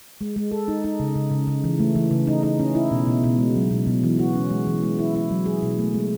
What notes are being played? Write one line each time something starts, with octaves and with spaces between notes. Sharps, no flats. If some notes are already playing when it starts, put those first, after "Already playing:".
G#3
G#3
A4
D#4
D#4
C#3
C#3
C#3
C#3
E3
A3
E3
C#3
D#4
D#4
C#4
E4
B2
B2
B2
G#3
F#3
B2
B2
E3
F#4
C#4
G#3
E3
G#3
E4
E4
F#3
G#4
B2
A3
G#3